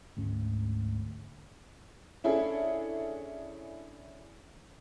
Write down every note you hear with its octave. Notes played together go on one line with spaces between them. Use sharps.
D2 G#2 C#4
C#4 D4 E4 G#4 A4